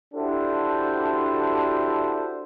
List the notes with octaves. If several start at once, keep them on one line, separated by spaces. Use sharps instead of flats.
D4 E4 F#4 G4 A4 C5